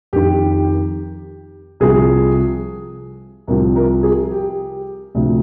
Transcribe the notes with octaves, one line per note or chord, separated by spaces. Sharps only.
F2 D#3 G4
C2 C3 F3 G#4
C2 C3 F3 A#4
A#4
G#4
G4
D2 C3 F3